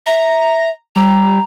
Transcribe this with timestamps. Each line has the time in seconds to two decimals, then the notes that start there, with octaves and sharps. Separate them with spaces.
0.06 E5 A#5
0.96 G3 A#5